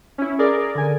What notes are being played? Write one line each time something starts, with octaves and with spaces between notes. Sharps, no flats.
C#4 E4
G#4 A#4 D5
D3 G#5